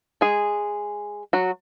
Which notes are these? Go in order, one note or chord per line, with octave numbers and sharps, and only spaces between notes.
G#3 G#4
F#3 F#4